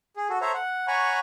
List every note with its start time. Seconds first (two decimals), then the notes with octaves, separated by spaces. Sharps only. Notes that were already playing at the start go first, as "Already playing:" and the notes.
0.16 G#4
0.29 F#4 A4
0.41 A4 C5 C#5 E5 A#5
0.54 F#5
0.88 C#5 F#5 G#5 A#5 B5 C#6